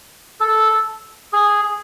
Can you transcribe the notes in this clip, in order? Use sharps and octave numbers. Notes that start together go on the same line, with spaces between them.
A4
G#4